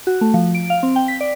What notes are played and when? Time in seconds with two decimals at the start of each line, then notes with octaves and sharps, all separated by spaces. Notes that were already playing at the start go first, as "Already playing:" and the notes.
0.07 F#4
0.21 A3
0.34 F3
0.55 D7
0.70 F5
0.83 C4
0.96 G5
1.08 B6
1.20 D5